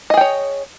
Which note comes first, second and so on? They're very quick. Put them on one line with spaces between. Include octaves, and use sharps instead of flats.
D#5 G#4 G5 C#5